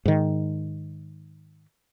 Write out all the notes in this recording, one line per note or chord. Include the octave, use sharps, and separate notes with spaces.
G#2 D#3